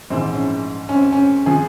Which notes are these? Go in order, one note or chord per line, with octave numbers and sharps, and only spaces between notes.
A#1 G#2 E3 C4
C#4
C#4
C4
C#4
C3 F3 G#4